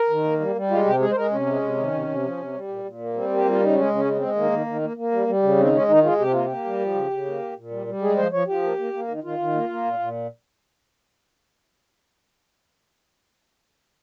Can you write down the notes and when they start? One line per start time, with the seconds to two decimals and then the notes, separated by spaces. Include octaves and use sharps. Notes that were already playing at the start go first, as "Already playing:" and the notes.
Already playing: A#4
0.10 D#3
0.24 A#3
0.40 G3
0.55 G3
0.71 G#3 F4
0.85 C3 G4
1.00 G#3 G#4
1.11 C5
1.16 G#3 A#4
1.31 C3 C#4
1.46 G#3
1.62 C3
1.77 D#3
1.93 C3
2.08 C3
2.23 F3
2.37 C3
2.53 G3
2.68 A#2
2.84 A#2
2.99 A#3
3.14 G3 C4
3.29 A#3 G4
3.45 G3 F4
3.60 C#3 D#4
3.75 G#3 C#4
3.90 C#3
3.95 C#4
4.05 G#3
4.16 G#3 C4
4.36 D#3 A#3
4.51 D#3
4.66 D#3
4.81 A#3
4.97 A#3
5.11 G3
5.27 G3
5.43 C#3
5.58 D#3 C4
5.72 G#3 C#4
5.88 D#3 D#4
6.03 G#3 F4
6.19 C3 G4
6.32 A#3 F4
6.45 A#3 G4
6.64 G3
6.79 F3
6.94 C#3
7.11 C#3
7.25 A#3
7.40 A#2
7.56 A#2
7.71 G3
7.87 G3
8.01 G#3 G#4
8.17 F3 C5
8.32 F3 C#5
8.47 F3 G4
8.63 A#3
8.78 A#3
8.93 A#3
9.08 D#3
9.24 D#3 F4
9.39 D#3
9.54 A#3
9.69 A#3
9.84 A#2
9.99 A#2